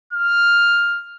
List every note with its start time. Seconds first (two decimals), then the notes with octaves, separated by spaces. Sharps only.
0.13 F6